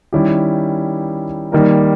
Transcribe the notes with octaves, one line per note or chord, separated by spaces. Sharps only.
D#3 G3 C#4 E4 G4
D#3 G3 A#3 D#4 A#4